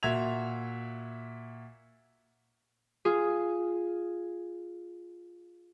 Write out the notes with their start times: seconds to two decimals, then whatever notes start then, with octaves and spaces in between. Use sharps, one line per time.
0.03 A#2 F#4 E5 G#6 F7
3.05 F4 G#4